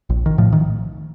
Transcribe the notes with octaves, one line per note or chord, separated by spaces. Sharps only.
A#1
D#3
A2 F3
D#3